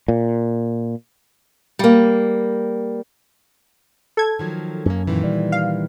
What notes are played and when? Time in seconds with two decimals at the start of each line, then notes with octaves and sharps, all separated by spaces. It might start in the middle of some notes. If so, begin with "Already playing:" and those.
0.08 A#2
1.79 G3 A#3
4.17 A4 G#6
4.39 D#3 F3 F#3
4.86 F#2 A#3 C#4
5.07 A#2 D#3 E3
5.24 G3
5.52 F5